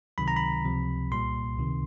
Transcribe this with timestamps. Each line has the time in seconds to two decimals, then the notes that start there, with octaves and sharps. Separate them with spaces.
0.18 C#2 C3 D#3 F#3 B5
0.28 A#5
0.36 B5
0.65 C#2 C3 F3
1.11 C2 A#2 G3 C6
1.58 C#2 C3 D#3